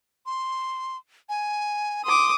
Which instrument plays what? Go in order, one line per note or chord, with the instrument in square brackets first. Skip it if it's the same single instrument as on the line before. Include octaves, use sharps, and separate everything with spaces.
[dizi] C6
G#5
[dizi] C6 [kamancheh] D6 D#6